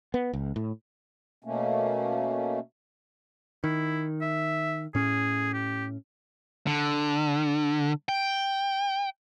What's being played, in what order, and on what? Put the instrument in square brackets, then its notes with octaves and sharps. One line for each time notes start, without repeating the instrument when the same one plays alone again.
[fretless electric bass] B3
C#2
A2
[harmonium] B2 A3 A#3 C#4
[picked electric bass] D#3 [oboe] E4
[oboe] E5
[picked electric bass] A2 C#4 [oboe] G#4
[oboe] G4
[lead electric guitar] D3
G5